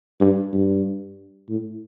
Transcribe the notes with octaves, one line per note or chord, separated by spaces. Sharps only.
G2
G2
A2